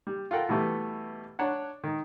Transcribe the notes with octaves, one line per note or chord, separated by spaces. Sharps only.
G3
F4 A4 A#4 F#5 G5
B2 E3 G3 A3 B3
D4 C#5 F#5
D#3